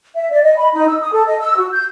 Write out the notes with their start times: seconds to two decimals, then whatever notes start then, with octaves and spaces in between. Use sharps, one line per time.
0.15 E5
0.31 D5
0.42 D#5
0.58 B5
0.73 D#4
0.88 E6
1.00 D#6
1.12 A4
1.27 D#5
1.40 E6
1.56 F#4
1.72 G6